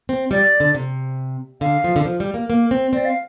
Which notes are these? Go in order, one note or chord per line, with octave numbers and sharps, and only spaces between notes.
C4
G3 D5
D3
C3
D3 F5
F3
D3
F3
G3
A#3
A#3
C4
C4 D5
F5